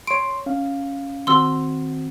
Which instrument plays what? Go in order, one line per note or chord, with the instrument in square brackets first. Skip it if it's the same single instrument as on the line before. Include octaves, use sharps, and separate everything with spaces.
[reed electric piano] C#5 C6 [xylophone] D7
[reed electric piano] C#4 F5
[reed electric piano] D#3 C4 F#4 [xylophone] C6 E6